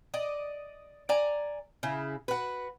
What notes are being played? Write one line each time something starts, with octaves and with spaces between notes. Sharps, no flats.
D5 D#5
D5 G#5 A#5
C#3 E4
F#4 B4